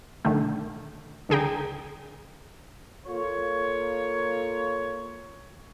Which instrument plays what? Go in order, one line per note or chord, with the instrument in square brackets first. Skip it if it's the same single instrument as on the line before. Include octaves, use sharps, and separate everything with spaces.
[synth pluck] B1 D3 D#3 A3
C#2 D3 G#4 G5 A#5
[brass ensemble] A#3 F4 A4 C#5